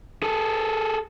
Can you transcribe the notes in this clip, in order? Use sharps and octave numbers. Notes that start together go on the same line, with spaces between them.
G#4 A4